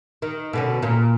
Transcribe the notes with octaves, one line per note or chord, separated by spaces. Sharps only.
D#3
B2 D3 C#4
A#2